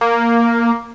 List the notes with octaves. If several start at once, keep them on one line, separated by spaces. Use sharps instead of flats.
A#3